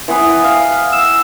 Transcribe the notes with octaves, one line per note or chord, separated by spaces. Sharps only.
E3 B3
F5
E6